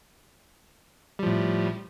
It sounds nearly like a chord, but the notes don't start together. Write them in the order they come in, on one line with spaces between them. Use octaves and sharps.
G3 F3 A2